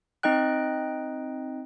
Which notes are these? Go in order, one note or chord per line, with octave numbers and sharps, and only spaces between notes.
C4 D#4 D#5 G5 F#6